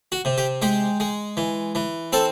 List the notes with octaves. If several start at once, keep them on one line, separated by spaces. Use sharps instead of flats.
F#4
C3
G4
G#3 G4
G#3
E3
E3
C4 A4